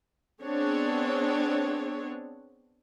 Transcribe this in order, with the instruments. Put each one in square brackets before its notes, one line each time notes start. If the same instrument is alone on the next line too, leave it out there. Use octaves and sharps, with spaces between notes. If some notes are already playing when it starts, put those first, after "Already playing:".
[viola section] B3 C4 D4 G#4 C#5